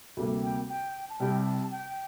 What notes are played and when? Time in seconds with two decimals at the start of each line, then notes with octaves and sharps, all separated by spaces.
0.17 D2 C3 G3 A#3
0.43 G5
0.69 G5
1.10 A5
1.20 C2 C3 G3 G5
1.45 A5
1.71 G5